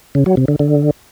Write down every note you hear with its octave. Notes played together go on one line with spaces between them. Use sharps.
C#3
F#3
C3
D3
D3